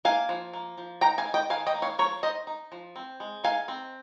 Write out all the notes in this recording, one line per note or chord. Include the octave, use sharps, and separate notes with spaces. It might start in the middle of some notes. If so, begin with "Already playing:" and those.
A#3 F5 G#5
F3
A#3
F3
D#3 G5 A#5
F5 G#5
D#3
D#5 G5
D#3 F5 G#5
D#5 G5
A#3
C#5 F5
F3 A#4 C#5
D#4 C5 D#5
D#4
F3
C4
G#3
D#4 F5 G#5
C4